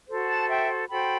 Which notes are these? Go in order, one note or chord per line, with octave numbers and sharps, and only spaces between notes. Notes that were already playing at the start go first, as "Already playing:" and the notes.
F#4 A4 C5
F#5 A5
E5 G5
F#4 A4 C5 G5 B5